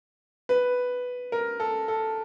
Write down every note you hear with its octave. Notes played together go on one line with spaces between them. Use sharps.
B4
A#4
A4
A4